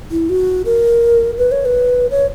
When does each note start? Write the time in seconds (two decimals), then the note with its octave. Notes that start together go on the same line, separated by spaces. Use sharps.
0.11 E4
0.29 F#4
0.66 A#4
1.38 B4
1.52 C#5
1.65 B4
2.11 C#5